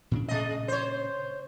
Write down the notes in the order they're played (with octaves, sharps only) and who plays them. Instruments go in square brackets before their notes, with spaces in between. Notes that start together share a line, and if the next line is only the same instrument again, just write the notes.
[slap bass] A#2 C#3 D4
[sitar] G#3 D#5
C5 C#5